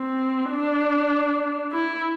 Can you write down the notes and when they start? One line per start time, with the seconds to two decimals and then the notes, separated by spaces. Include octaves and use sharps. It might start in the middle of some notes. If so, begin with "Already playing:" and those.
Already playing: C4
0.51 D4
1.73 E4